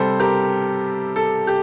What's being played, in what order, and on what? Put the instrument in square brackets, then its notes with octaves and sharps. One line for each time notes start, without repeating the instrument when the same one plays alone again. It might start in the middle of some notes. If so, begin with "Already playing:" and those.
Already playing: [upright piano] C3 G3 A4 C5
G4 A#4
A4
G4